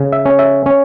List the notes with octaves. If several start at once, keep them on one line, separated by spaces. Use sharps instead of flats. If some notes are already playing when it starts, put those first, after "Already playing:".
Already playing: C#3
E5
C#4
E5
C#4